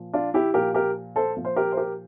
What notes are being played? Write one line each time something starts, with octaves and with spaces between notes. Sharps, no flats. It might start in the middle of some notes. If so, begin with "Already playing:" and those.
Already playing: A#2 F3
D4 F4
E4 G4
A#2 F3 G4 A#4
G4 A#4
A4 C5
A#2 F3
C5
G4 A#4
C5
G4 A#4